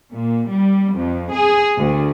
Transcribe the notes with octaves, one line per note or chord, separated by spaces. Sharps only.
A#2
G3
F2
G#4
D2